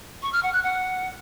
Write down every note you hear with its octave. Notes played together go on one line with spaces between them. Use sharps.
C#6
F6
F#5
F#6
F#5